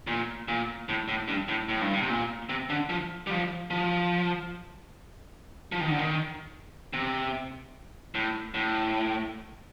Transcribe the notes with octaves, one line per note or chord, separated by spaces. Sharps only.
A#2
A#2
A2
A2
G2
A2
A2
G2
A2
C3
A#2
C3
D3
F3
G3
F3
F3
F3
D#3
D3
D#3
C3
A2
A2